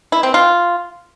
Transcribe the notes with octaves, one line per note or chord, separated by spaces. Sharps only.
E4
C4
F4